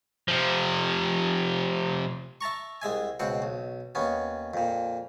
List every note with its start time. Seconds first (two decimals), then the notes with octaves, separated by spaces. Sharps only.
0.28 C3 F3
2.41 E5 A5 A#5 C#6
2.82 C2 G#3 E5 G#5
3.20 C#2 B2 C4 F#5
3.42 B1
3.95 D#2 B3 C#4
4.54 F2 A#2